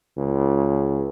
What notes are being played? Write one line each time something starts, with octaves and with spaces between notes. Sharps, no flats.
C#2